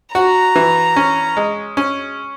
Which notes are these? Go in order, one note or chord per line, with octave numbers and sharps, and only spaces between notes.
F#4 A#5
E3
C#4
G#3
C#4